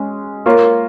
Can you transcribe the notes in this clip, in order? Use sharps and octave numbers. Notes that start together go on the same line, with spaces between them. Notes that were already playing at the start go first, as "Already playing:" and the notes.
Already playing: G#3 C#4
A#3 F4 A#4 C#5